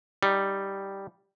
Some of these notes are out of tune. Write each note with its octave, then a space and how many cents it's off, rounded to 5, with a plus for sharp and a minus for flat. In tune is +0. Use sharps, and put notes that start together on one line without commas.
G3 +0 D#4 +0